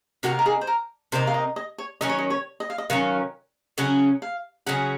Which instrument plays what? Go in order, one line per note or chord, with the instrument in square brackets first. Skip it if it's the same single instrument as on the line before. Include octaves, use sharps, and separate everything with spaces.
[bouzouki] C3 D#3 A#3 D#4 [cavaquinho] F#4
[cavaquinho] A#4
G#4
C5
A#4
[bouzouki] C3 D#3 A#3 D#4 [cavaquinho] C5
[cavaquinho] F5
D#5
D#5
C#5
[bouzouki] D#3 F#3 C#4 [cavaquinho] D#5
[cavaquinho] C#5
D#5
C#5
D#5
F5
D#5
[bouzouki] D#3 F#3 C#4 [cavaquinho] F5
[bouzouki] C#3 F#3 C#4 G#4 [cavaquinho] F#5
[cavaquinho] F5
[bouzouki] C#3 F#3 C#4 G#4 [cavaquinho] F#5